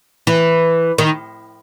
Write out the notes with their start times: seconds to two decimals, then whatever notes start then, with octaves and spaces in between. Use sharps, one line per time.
0.27 E3
0.98 D#3